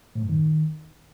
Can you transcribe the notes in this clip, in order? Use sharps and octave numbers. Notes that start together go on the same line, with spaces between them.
A2
F#2
D#3